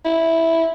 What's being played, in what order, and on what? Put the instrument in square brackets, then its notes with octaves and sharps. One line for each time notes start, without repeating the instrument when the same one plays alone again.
[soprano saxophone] E4